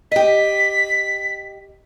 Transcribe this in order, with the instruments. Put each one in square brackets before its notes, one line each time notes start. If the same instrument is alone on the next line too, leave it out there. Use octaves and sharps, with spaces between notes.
[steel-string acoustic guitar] G4 D#5 [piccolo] B6